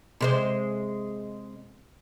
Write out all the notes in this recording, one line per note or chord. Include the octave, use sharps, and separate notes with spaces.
C3 G#3 C5